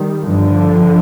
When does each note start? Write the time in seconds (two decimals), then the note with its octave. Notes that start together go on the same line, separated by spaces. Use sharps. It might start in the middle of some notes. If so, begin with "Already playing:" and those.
Already playing: D#3 G3
0.22 G1 G2 D3 F3